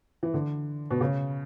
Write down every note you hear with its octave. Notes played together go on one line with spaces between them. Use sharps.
E3
D3
B2
C#3